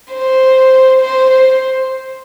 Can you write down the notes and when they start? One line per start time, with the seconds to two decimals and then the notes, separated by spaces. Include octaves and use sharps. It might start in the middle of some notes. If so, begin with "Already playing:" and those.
0.13 C5
1.01 C5
1.30 C5